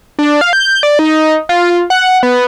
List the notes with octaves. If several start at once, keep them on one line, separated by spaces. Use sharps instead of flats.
D4
F5
G6
D5
D#4
F4
F#5
B3